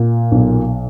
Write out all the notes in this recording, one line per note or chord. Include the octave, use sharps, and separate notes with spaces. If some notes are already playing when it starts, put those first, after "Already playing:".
Already playing: A#2
B1